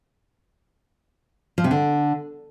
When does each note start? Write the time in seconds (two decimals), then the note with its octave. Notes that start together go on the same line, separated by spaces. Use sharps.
1.58 F3
1.64 C3
1.71 D3